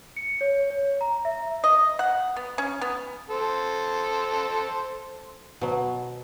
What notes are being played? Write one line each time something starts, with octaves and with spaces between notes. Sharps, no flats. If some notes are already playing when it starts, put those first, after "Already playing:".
C#7
C#5
C#5
A#5
E5
D#5
F#5
B3
C#4
B3
A4 C5
B2 F#3